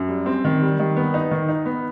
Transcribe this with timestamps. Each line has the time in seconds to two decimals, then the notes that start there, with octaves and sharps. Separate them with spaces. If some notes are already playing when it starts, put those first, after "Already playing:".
Already playing: F#2
0.09 G3
0.26 C4
0.45 D#3
0.62 G3
0.79 D#3
0.96 B3
1.14 D#4
1.31 D#3
1.49 D#4
1.66 B3